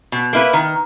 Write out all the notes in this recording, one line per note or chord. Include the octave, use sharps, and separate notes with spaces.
B2
A#3 E4 B4
D#3